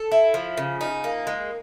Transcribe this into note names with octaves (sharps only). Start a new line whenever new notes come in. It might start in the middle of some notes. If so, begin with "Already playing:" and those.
Already playing: A4
E4
F3
C#3
D#4
A#3
G#3